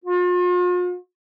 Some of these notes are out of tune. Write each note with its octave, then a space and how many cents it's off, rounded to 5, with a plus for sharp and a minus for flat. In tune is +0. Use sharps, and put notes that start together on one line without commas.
F4 +40